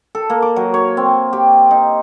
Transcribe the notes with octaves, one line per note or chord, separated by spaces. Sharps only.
A4
A#3
D6
F#3
C#5
C4
G4
D#4